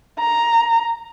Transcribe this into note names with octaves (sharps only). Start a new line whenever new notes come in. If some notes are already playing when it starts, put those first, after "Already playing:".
A#5